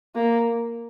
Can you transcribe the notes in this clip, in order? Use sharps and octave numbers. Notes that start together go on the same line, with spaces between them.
A#3